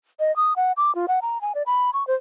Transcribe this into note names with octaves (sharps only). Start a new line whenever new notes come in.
D#5
D#6
F#5
D6
F4
F#5
A#5
G#5
D5
B5
C#6
C5